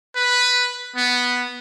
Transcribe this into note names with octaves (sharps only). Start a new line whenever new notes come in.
B4
B3